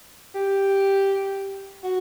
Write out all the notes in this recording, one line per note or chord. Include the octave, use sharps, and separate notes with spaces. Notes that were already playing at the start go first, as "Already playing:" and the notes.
G4
F#4